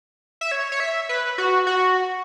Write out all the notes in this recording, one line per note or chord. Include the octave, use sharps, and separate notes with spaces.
E5
C#5
C#5
E5
B4
F#4
F#4